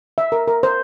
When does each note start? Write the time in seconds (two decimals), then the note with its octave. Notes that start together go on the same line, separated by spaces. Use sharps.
0.18 E5
0.32 A#4
0.48 A#4
0.63 C5